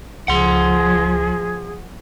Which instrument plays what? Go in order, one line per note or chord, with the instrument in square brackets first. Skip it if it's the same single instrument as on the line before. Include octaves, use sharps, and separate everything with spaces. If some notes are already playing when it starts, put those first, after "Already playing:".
[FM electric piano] C#2 [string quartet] F3 [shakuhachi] G#4 [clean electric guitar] F#5 C6